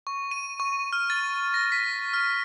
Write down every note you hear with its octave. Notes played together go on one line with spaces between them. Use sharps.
C#6
D#7
C#6
F6
A6
A#6
B6
F6